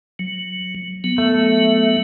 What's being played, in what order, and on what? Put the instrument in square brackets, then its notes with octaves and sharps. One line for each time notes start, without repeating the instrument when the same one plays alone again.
[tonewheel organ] F#3
F#3 B3
[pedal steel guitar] A3